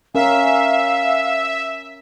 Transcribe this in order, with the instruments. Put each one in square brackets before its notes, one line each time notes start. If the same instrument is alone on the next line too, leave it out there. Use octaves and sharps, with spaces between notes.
[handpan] C#4 A#4 [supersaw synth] E5 [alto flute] F5